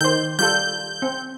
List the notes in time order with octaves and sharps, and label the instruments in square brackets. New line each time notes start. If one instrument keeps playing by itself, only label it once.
[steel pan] D#3 C5 [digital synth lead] G6
[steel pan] G3 F4 A4 [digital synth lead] G6
[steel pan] C4